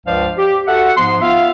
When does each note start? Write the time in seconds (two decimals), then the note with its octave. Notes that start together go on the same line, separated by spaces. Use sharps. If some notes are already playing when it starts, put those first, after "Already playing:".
0.06 C#2 G2 F3 C5 D5 F5
0.38 G4
0.67 F#4 A4 E5 F#5
0.97 G#2 F3 B3 C6
1.21 B3 F4 E5 F5